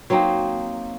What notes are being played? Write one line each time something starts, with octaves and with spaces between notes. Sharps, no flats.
F#3 A#3 C4 D#4